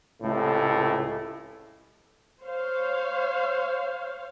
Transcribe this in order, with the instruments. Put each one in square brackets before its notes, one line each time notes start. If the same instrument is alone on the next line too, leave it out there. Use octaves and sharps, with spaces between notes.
[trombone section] C#2 A2 C3 A3
[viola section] C5 C#5 F5